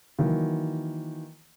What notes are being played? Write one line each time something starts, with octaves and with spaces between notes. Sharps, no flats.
D#3 E3 F#3 A#3